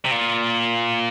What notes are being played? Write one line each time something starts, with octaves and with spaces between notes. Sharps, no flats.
C3
A#2